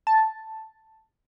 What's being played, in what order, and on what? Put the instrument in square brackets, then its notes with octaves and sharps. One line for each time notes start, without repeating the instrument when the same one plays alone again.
[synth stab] A5